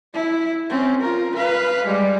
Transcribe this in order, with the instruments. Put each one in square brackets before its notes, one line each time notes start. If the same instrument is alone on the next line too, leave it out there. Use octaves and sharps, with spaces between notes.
[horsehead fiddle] E4
C4 C#4
F4 A#4
B4 F5
G3 G#3